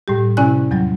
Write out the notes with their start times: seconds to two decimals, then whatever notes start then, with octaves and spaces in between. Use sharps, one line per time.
0.08 A2 G3 G4
0.37 C3 C#4 E4 D5 G#5 F#6
0.71 E2 F#3 G3